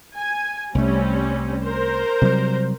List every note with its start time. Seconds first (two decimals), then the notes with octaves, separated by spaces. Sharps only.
0.15 G#5
0.75 C2 G3 A3 C4 C#4
1.63 A#4 C5
2.21 C3 F#3 G3